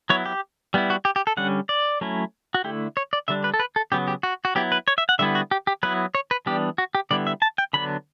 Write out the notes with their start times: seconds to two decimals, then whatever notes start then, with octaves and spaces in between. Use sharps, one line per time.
0.10 F#3 B3 E4 C#5
0.26 G4
0.74 G3 B3 E4
0.90 F#4
1.05 G4
1.16 G4
1.27 A4
1.37 D3 G3 C#4 F#5
1.69 D5
2.01 F#3 A3 C#4 E4
2.54 F#4
2.64 D3 A3 E4 G4
2.97 C#5
3.13 D5
3.28 D3 G3 D4 E5
3.44 B4
3.54 A4
3.60 B4
3.76 A4
3.92 C#3 F#3 B3 G4
4.08 G4
4.23 F#4
4.45 F#4
4.55 F#3 B3 E4 G4
4.72 B4
4.88 C#5
4.98 E5
5.09 F#5
5.19 D3 G3 B3 E4 E5
5.35 F#4
5.51 G4
5.67 G4
5.83 F#3 B3 E4 B4
6.15 C#5
6.31 B4
6.46 E3 G3 B3 D4 G4
6.78 F#4
6.95 G4
7.11 D3 G3 B3 E4 D5
7.27 E5
7.42 A5
7.58 G5
7.73 D3 F#3 B3 D4 B5